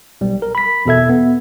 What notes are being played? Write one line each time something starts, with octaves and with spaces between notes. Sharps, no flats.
B1 G3
A#4
B5 B6
E2 B2 A4 E5 G#6
B3